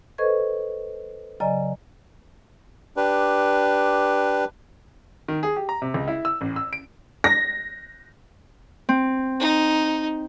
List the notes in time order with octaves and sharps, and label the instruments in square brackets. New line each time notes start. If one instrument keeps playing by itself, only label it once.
[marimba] A4 B4 C5 D#5 C#6 G#6
C#3 F#3 D5 D#5 G#5 A#5
[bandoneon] D4 G4 B4
[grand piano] D#3
G#4
G4
A#5
C3
C#2
E4
E6
A1
E6
D7
[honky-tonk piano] A#6
[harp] C4
[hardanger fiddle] D#4